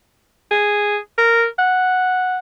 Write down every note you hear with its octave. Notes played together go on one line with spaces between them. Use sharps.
G#4
A#4
F#5